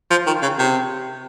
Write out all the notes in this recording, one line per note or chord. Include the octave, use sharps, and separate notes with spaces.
F3
D#3
C#3
C3